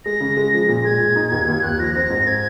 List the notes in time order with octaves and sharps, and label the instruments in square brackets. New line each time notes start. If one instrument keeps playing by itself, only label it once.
[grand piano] G#3 [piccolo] A#6
[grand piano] C#3
G#3
F3
[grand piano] A#2 [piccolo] A#6
[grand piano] G#3 [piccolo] G#6
[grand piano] A#2
D#4
D#2
D#2
[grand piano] D#2 [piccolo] F#6
[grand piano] F3 [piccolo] A#6
[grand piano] C4 [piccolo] A#6
[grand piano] G#2
[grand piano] C4 [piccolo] G#6